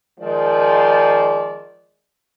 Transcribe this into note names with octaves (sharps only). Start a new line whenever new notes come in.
D#3 F3 G#3 D5